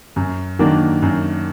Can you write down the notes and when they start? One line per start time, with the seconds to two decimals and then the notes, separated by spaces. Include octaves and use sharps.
0.16 F#2
0.59 D#3 F#3 A#3 D4
1.02 F#2